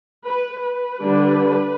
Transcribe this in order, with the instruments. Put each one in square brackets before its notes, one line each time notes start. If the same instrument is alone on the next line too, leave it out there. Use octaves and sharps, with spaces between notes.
[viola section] B4
B4
D3 G3 D4